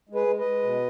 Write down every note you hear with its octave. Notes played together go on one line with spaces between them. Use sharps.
G#3
G#4 B4
G#3
B4 D#5
G#3
B2